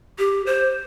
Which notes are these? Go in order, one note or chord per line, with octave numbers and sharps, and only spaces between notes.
G4
C5